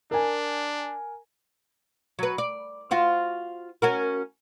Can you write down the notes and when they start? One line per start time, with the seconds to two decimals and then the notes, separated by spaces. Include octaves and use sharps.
0.11 D4 A#4 G#5
2.19 F#3 B4
2.38 D5
2.91 F4 F#4 C5
3.82 C#4 F#4 A#4